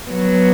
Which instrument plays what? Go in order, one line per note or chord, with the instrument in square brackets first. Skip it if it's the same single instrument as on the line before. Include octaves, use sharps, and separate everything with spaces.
[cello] F#3 [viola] B3